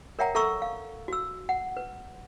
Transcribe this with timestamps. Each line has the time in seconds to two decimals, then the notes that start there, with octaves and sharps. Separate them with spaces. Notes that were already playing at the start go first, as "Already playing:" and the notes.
0.19 A#4 C#5 E5 F#5 G5 A#5
0.35 A4 E5 A#5 C#6 E6
0.62 F5
1.08 F#4 E6
1.49 F#5
1.77 B4